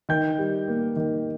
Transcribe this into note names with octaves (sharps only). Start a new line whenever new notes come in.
D#3 G5 G6
G3
A#3
D#3